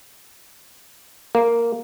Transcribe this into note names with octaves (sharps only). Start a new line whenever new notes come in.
A#3